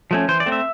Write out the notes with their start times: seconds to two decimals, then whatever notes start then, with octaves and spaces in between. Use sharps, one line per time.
0.11 F3 A3 C#4
0.28 E3 C5
0.40 D5
0.46 A3 C4
0.52 E5